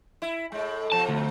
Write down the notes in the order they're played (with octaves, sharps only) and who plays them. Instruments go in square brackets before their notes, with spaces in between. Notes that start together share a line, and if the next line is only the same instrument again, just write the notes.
[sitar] E4
A2 G#3
[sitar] B2 F3 [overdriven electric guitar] A5
[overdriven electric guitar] D2